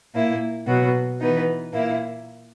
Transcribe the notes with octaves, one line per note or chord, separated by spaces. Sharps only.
A#2 A#3 E4
B2 F#3 B3 F#4
E3 B3 D#4
A#2 A#3 E4